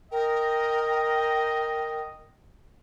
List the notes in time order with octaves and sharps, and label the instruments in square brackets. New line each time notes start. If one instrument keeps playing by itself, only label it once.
[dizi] A#4 [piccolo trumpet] D#5 [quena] G5